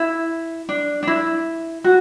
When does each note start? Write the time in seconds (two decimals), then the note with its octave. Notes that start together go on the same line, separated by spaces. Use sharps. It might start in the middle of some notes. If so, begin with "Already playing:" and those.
Already playing: E4
0.69 D4
1.03 D4
1.07 E4
1.84 F#4